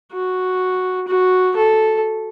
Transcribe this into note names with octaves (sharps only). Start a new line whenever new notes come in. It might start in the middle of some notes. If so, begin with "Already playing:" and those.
F#4
F#4
A4